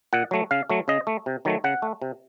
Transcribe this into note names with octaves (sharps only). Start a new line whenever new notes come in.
A#2 F#5
F#3 A3
C#3 F5
F#3 A3
C#3 D#5
A3
C3
D#3 F#3 A3
C#3 F#5
A3
C3